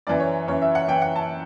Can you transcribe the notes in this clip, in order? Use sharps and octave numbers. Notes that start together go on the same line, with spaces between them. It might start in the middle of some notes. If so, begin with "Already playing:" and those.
F#2 E3 D5
C#5
F#2 E3 C#5
E5
F#5
F#2 E3 G5
F#5
A5